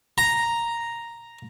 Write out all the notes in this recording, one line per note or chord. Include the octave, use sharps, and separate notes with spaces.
A#5